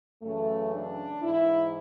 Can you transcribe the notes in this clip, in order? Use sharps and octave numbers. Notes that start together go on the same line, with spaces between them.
F#2 C#3 E3 A3
D4
G#2 E3 E4